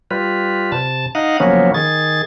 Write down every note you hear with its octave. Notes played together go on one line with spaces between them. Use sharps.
G3 F4 B4
C3 A5
D#4 D#5 F5 F#5
C#3 F3 F#3 A#3 B3 C#4
D#3 G#4 A6